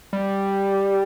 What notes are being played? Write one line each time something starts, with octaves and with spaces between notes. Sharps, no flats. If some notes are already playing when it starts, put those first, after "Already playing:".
G3